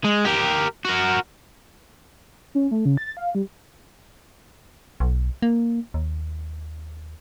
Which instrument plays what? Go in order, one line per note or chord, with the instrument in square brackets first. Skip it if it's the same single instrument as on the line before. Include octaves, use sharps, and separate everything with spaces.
[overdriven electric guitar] G#3
G4 A#4
F#4 A#4
[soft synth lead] C#4
A3
C#3
A6
F5
G3
[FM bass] B1
A#3
D#2